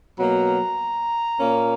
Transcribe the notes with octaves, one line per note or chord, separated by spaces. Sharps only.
B2 F#3 A#3 A#5
A#2 A#3 C#4